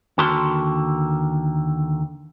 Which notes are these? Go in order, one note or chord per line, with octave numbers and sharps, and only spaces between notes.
D#2 D3 F#4 A#4 A5 C6